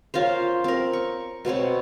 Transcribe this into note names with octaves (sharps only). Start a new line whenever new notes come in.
C#4 F4 A#4 C5
C4 A#4
C#6
B2 B3 C4 C#5